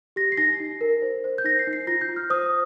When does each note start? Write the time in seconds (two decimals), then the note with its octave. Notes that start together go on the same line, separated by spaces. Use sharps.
0.16 G4 A#6
0.32 C7
0.37 D#4 A#6
0.60 D#4
0.81 A#4
1.02 C5
1.24 C5
1.38 G6
1.44 D#4 A#6
1.59 C7
1.67 D#4
1.73 C7
1.87 F4 A#6
2.01 G6
2.09 F4
2.16 F6
2.30 C5 D#6